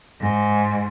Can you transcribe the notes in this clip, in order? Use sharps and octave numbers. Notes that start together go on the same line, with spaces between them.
G#2